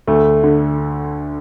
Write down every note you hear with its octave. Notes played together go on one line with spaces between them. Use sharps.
D2 A3
D3